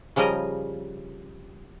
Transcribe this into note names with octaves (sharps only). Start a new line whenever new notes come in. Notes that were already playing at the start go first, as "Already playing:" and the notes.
C#3 F3 G3 A#4 D#5 G#5